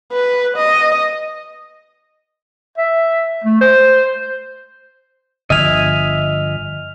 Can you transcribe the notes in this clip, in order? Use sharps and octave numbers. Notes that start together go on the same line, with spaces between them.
B4
D#5
E5
A3
C5
G1 D3 F3 D#5 E5 G#5 F6 F7